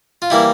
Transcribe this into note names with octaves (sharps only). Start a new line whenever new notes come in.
F4
E3 G3 A#3 E4